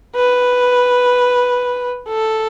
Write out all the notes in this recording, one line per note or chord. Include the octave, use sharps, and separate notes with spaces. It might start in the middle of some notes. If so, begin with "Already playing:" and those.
B4
A4